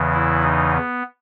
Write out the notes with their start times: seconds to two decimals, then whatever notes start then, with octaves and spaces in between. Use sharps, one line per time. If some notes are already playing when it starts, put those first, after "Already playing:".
Already playing: E2 C#3 E3
0.13 E4
0.42 D#4
0.72 B3